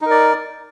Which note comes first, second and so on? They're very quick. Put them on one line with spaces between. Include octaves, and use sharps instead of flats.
D#4 A#4 D5